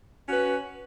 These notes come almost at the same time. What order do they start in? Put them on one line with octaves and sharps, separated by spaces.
C#4 F#4 B4